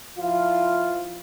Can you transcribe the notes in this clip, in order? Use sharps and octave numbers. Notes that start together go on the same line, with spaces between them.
F3 E4 F4